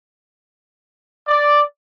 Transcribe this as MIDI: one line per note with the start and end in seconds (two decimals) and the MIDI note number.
1.28 1.62 74